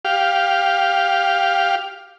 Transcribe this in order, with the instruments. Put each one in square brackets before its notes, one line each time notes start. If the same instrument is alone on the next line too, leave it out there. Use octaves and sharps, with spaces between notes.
[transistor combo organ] G4 F5